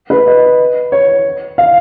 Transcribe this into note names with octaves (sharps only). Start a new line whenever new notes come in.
B4
D#5
C#5
F5